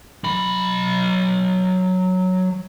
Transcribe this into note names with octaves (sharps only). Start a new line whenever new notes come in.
F#3 B5